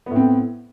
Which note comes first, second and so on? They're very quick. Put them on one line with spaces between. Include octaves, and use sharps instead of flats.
B3 A2 C4